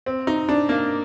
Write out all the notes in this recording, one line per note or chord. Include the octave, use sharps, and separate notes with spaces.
C4
D#4
D4
A#3